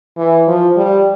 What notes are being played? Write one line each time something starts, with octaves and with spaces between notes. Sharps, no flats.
E3
F3
G3